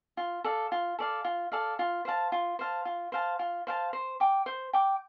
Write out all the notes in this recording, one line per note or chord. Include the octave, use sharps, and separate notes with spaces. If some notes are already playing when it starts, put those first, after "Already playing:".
F4
A4 D5 F5
F4
A4 D5 F5
F4
A4 D5 F5
F4
C5 F5 A5
F4
C5 F5 A5
F4
C5 F5 A5
F4
C5 F5 A5
C5
G5 D6
C5
G5 D6